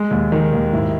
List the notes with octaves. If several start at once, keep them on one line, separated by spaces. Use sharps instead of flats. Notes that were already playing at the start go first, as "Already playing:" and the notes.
Already playing: G#3
D#2
D#3
D#2
G#2 E4